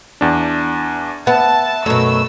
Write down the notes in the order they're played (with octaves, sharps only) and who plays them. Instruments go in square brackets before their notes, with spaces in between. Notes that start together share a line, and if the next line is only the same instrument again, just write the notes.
[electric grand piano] E2 D4
[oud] B3 [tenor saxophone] E5 [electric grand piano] F#5 [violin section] A5
[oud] F#2 B2 [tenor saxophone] A3 [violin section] E6